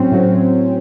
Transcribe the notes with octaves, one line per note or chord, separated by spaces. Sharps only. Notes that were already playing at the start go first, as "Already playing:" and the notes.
Already playing: A2 F#3 C4 C#4
A2 F#3